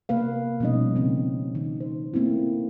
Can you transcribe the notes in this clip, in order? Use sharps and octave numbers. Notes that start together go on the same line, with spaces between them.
C3 A#3 B4 F5
B2 F3 G3 C#4 D#4 D#5
C#3 C4 C#4
D#3 D#4
C5
A3 A#3 C4 C#4 E4